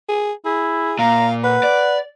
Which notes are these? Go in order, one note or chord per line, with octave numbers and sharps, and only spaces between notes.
G#4
E4 G#4
A#2 F5 A#5
B4 F#5
D5